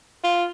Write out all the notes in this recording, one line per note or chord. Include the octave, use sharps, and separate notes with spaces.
F4